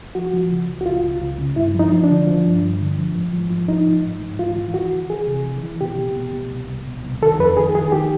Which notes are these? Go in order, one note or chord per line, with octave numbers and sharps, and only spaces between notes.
F3 F#4
F3
C#3
C#2
F#4
C#2 F4
C#2
C#2
C#3
G2 E4
F3 D#4
F3
D4
D3
F3
G2
G2
D3
F3
G#2
F3
F3
F3 D#4
G#2
G#2
G#2
E3 F4
E3
E3 F#4
D2
E3 G#4
C3
E3
E3
B2 G4
B2
B2
B2
C2
C2
B2
C2
D#3 A4
F2 B4
D#3 G#4
D#3 G#4
D#3 G4